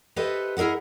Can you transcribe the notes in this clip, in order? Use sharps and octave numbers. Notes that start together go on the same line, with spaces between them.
G4 A4 B4 C5 D#5 E5
E4 G#4 A#4 D#5 F#5